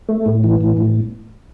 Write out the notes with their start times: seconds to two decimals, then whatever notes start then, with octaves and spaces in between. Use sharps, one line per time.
0.09 A3
0.26 A2
0.44 E3
0.61 A2
0.77 A2